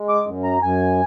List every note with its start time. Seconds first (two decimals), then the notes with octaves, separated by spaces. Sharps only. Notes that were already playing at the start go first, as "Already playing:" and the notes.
Already playing: G#3
0.09 D6
0.26 F#2
0.44 A#5
0.62 F#2 G#5